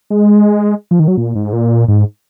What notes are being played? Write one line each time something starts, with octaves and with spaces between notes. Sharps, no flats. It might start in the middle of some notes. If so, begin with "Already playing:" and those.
G#3
F3
D#3
F#3
A#2
G#2
A#2
G#2